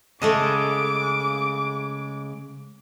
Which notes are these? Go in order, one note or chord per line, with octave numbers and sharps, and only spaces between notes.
C#3 G#3 A3 A4 D#5 D6